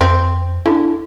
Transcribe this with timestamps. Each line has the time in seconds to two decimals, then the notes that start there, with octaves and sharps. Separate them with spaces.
0.01 F2 C4
0.66 D3 E4